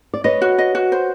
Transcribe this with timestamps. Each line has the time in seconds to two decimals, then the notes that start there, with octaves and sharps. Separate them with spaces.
0.14 D5
0.24 B4 C#5 D#5
0.42 F#4
0.58 D#5
0.75 F#4
0.92 C5